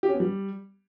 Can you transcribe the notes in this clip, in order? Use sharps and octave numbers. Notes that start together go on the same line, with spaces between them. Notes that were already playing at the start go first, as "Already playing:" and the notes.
G4
C#4
B3
G3